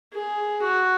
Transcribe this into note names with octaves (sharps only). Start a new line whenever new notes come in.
G#4
F#4